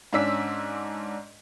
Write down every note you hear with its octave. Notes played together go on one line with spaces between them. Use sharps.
G#2 C#4 D4 E6 B6